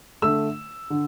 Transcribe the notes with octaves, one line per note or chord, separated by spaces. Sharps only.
D3 A3 E6
D3